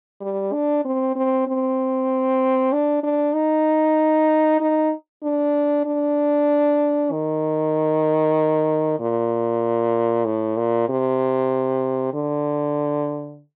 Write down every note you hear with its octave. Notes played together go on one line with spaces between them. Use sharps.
G3
D4
C4
C4
C4
D4
D4
D#4
D#4
D4
D4
D#3
A#2
A2
A#2
C3
D3